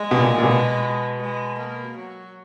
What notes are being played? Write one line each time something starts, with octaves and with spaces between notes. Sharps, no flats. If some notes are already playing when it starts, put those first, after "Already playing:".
Already playing: G#3
B2
A#2
A#2
B2
G#3
A#3
F#3